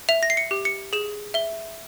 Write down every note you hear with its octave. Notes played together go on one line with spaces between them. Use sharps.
E5 F7
A#6
C7
C#7
G4
C#7
G#4 E7
E5 G7